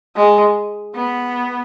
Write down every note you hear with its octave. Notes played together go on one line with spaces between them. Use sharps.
G#3
B3